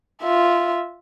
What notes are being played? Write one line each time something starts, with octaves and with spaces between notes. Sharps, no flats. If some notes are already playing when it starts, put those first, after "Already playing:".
F4 E5